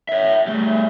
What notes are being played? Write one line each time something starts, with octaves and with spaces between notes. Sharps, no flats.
C#5 E5
G3 A3